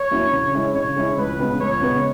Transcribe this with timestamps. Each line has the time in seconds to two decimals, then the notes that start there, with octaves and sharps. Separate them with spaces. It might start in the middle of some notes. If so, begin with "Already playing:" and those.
Already playing: C#5
0.11 F#3 A#3 C#4 E4
0.33 C#3
0.54 G#3 C#4 E4
0.74 C#3 C#5
0.96 G#3 C#4 E4
1.17 C#2 B4
1.39 C#3 G#3 B3
1.61 C#2 C#5
1.81 C#3 G#3 B3